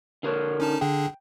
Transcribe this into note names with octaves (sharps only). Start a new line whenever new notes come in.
D3 A#4 C#5
C#4 D#4 A5
D3 D4 G#4 G5